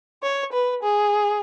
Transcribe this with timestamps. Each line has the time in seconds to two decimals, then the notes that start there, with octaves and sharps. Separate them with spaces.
0.23 C#5
0.52 B4
0.83 G#4